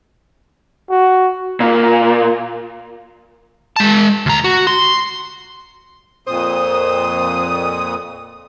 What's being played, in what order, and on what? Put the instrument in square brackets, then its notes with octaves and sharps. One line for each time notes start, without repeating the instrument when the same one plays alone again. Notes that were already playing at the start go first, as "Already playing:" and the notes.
[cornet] F#4
[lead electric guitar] A#2
G#3 A5
D2 A#5
F#4
C6
[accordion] F2 A#2 D#6 [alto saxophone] C5